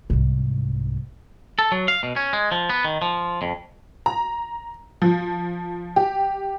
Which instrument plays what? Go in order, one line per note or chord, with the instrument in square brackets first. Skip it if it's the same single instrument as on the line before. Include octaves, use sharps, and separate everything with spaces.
[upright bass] C2 G#2
[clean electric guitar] A4
F#3
F5
B2
C#4
G#3
F3
B3
D#3
F3
F2
[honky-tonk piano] A#5
F3
G4